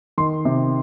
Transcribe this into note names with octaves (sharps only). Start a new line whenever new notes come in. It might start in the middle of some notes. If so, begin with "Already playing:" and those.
D#3 C6
C3